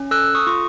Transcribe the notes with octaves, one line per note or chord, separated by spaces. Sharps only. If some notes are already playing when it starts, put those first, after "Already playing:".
Already playing: C#4
A4 E6 F#6
C#6 D#6
F4 C#6